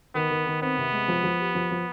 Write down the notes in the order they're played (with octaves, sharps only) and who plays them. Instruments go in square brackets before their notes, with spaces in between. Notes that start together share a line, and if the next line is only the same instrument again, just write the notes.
[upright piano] D#3 [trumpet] B3
[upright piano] D#3
D#3
[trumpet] B3 [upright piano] C4
[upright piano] C3
G#3
F3
F3
G4
F3
F3